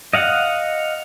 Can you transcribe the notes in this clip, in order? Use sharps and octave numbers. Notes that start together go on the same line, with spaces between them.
D#5 F5 F#5